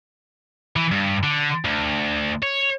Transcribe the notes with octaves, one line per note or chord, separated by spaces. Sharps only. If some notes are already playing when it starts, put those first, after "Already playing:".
E3
G2
D3
D2
C#5